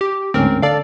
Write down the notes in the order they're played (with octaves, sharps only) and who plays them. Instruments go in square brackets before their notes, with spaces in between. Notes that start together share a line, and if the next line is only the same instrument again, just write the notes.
[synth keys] G4
[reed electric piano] D2 G#2 C#4 [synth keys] C4 A#4
[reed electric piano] D3 A4 [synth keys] D5 F5